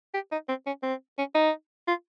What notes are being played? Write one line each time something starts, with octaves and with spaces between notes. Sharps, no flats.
G4
D#4
C4
C#4
C4
C#4
D#4
F4